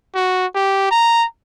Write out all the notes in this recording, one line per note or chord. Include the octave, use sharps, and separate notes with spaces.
F#4
G4
A#5